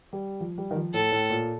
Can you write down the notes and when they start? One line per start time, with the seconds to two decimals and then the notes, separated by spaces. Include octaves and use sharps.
0.13 G3
0.41 F3
0.58 G3
0.71 D#3
0.76 F3
0.94 A2 A4
1.12 A2
1.30 A#2